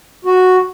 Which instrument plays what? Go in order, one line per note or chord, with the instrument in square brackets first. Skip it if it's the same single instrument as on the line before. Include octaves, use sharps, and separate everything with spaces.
[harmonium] F#4